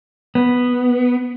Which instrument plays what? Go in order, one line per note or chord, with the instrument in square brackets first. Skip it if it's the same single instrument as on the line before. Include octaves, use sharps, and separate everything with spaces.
[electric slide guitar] B3